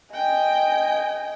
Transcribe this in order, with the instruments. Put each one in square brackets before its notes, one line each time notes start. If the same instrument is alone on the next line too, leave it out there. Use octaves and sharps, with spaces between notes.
[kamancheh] D#5 G#5 [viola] G5